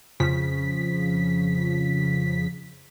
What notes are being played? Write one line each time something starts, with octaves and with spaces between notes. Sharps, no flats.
F2 C#3 F3 B6